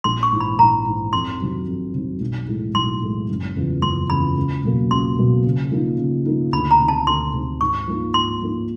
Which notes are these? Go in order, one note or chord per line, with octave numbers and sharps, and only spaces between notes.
A#1 C6
C#6
G#2 E3
B5
A#1 A#5
G#2 E3
F2 C6
C3 D#3 F#3
F2
C3 D#3 F#3
B1
A2 E3 G#3
B1 C6
A2 E3 G#3
F#1
E2 C#3 F3
F#1 C6
E2 C#3 F3 B5
C#2
B2 F#3 A#3
C#2 C6
B2 F#3 A#3
C#3
F3 A#3 D#4
C#3
F3 A#3 D#4
D2 B5
A#5
C3 D#3
A5
D2 C6
C3 D#3
G#2 C#6
F3 A#3 D#4
G#2 C6
F3 A#3 D#4